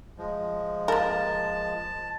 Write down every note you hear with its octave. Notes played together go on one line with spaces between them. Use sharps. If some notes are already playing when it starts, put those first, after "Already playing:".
F3 G#3
A#3 A#4 A5